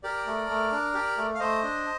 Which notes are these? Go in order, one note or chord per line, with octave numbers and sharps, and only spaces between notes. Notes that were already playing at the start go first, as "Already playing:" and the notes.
G4 A#4 D5
A3
A3
D4
G4
A3
F5
A3 C5 D#5
D4